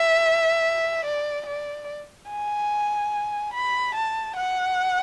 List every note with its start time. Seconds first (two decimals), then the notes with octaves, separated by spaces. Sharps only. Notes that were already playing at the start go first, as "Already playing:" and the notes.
Already playing: E5
1.05 D5
1.46 D5
2.30 G#5
3.54 B5
3.95 A5
4.36 F#5